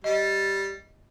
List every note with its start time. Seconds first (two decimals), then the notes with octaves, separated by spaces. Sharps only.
0.04 G3 D#5